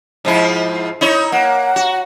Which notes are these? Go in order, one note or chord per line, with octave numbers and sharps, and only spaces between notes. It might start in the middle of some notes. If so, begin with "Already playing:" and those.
G#2 F3 E4
D#4 E4 C#5
A#3 F#5
F#4